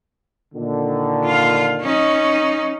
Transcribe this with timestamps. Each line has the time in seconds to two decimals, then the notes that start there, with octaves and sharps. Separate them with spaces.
0.54 A#2 D3 D#3
1.25 F4 F5
1.81 C#4 D#4